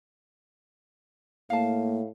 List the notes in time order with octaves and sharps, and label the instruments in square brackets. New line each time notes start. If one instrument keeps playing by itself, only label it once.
[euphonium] A2 [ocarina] A#3 [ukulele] F5 A5